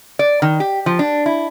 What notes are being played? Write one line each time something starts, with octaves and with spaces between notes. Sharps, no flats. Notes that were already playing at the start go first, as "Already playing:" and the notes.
D5
D#3
G4
F3
D4
E4